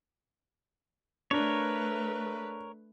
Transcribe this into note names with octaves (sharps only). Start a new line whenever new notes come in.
A3 D4 A#4 B4 C#5